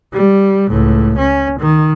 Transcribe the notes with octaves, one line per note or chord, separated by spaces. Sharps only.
G3
C#2 A2
C#4
D#3